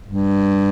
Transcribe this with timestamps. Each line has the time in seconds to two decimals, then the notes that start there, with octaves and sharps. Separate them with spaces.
0.06 G2